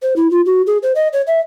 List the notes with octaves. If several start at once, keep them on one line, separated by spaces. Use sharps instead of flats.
C5
E4
F4
F#4
G#4
C5
D#5
C#5
E5